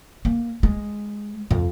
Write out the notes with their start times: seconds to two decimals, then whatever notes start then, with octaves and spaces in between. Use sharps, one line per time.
0.25 A#3
0.63 G#3
1.51 F2